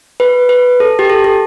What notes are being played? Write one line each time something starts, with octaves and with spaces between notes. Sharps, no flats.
B4
B4
A4
G4
A4
A4